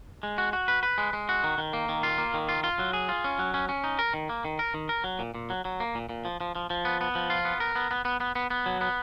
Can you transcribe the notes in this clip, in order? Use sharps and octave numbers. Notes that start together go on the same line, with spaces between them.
G#3
F#4
F#4
B4
B4
G#3
G#3
F#4
D#3
D#3
A#3
D#3
F4
A#3
D#3
F4
F4
F#3
G#4
F4
C#4
F#3
C#4
C#4
D#4
A#4
D#3
A#3
D#3
A#4
D#3
A#4
F#3
A#2
A#2
F#3
F#3
A#3
A#2
A#2
F3
F3
F3
F3
B3
B3
F3
F4
B3
A#4
B3
B3
B3
B3
B3
B3
F#3
B3